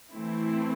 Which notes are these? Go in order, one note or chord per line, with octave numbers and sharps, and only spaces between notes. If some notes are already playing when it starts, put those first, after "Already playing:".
E3 A3 C4 E4